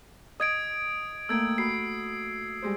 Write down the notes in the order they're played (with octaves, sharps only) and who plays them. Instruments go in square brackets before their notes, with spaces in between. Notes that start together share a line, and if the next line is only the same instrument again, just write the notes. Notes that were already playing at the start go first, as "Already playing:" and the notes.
[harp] D#5 [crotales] D#6 G#6 D7
[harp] A3 A#3 G5 [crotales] E6 G#6 D7
[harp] F#4 B5 [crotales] C7
[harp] G3 G#3 C5